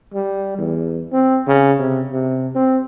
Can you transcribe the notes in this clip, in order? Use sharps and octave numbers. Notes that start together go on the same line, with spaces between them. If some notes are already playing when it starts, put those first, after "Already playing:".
G3
E2
C4
C#3
C3
C3
C4